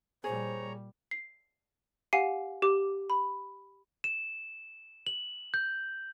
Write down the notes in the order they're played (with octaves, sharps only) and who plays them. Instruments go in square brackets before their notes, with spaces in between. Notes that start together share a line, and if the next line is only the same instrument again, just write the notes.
[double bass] A#2 G3 [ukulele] G#4 [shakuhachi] C5 [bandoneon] C#5 A#5
[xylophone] C7
G4 F5 F#5 G#5 C7 D#7
G4 D6
B5
[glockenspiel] E7
F#7
G6